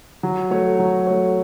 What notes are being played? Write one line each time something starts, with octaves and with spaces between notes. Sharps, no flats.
F#3
A3 F#4 C#5
F#3
A3 F#4 C#5